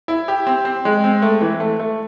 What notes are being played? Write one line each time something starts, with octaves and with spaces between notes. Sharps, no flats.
E4
G4
C4
C4
G#3
C4
A3
E3
A3
A3